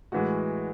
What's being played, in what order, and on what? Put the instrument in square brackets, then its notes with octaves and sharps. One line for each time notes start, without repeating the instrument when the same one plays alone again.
[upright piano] A2 E3 G#3 F#4